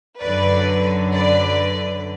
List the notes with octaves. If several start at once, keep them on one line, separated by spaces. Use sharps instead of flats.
F#2 D3 F#3 B4 D5
B4 D5